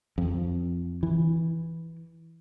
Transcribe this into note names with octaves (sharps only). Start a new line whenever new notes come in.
F2
E3